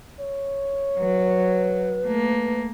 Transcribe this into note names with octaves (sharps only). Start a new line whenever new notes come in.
C#5
F#3 B4
A3 A#3